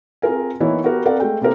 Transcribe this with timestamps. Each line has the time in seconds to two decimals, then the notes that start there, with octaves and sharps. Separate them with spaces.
0.22 C4 F4 G#4 A#4 G#5
0.60 E3 A#3 B3 D#4 E4 C#5
0.83 B3 F#4 G4 A#4
1.05 C4 A4 A#4 D5 F5 F#5
1.20 G#3 A3 G5
1.41 C3 A#3 G4 A4 A#4 C5